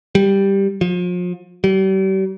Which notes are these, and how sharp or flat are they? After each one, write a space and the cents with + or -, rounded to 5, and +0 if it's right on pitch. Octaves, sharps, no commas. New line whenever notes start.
G3 +0
F3 +35
G3 -40